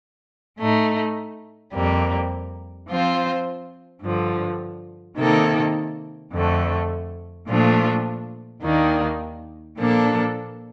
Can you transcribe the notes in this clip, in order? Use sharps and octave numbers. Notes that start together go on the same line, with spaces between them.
A2 A3 D#4
F2 C3 G3 A#3
F3 C4 F4 C5
G2 D3 F3
C3 D#3 A#3 D#4 A4
F2 D3 A3
A#2 F3 A3 D4 F4
D#2 D#3 A#3 D4
A#2 F3 A#3 D4 A4